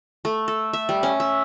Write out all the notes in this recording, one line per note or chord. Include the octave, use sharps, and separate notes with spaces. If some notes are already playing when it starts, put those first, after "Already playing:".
A3
A4
E5
G3
C#4
E5